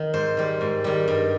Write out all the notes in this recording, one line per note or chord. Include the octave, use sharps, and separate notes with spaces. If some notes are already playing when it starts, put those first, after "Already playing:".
Already playing: D#3
G#2 C5
D#3 G3
G#2
D#3 G3
G2